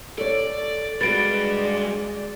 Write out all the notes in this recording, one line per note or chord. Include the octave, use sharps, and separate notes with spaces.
A4 C#5 D5
G2 G#3 F#4 B4 D5 A6 D7